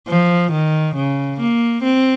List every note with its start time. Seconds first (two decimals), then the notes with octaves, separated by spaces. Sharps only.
0.08 F3
0.52 D#3
0.95 C#3
1.40 A#3
1.83 C4